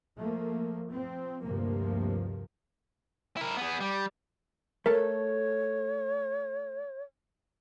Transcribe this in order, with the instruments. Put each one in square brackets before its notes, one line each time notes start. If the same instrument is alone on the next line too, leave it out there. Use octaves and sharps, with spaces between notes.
[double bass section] F3 A3 A#3
F3 C4
D2 G2 C3 F3 A#3
[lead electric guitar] E4 A#4
B3 G#4
G3
[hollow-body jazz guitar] A3 A4 [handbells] A#4 [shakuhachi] C#5